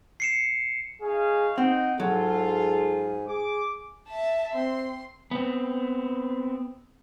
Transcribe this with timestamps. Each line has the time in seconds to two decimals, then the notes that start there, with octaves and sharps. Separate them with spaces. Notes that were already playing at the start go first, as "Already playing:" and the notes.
0.20 C7 C#7 E7
1.02 D#4 G#4 C#5 F5
1.58 C4 D#4 D#5 F#5 G5
2.00 G#2 F#3 F4 G#4 A4
3.28 G#4 D6
4.08 E5 A5
4.54 C4 C6
5.31 B3 C4